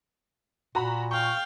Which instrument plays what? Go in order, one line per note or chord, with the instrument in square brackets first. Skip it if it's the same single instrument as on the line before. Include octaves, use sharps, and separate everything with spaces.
[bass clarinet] A#2 [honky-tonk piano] F#4 A#5 B5
[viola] F5 G5 [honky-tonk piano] C#6